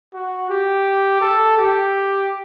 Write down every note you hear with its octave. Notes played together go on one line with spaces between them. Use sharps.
F#4
G4
A4
G4